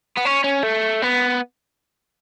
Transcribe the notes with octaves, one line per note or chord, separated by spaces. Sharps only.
B3
C#4
C#4
A3
B3